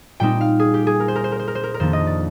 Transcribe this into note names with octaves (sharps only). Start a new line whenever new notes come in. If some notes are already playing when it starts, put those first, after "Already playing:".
A#2 G3 C4 D#4 G5
F5
G#4
G4
G#4
A#4
C5
A#4
C5
A#4
C5
A#4
C5
A#4
A#4
F2 D#3 A#3 D4 C5
D#5
D5